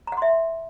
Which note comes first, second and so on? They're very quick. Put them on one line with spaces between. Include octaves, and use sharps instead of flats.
A#5 F#5 C6 E5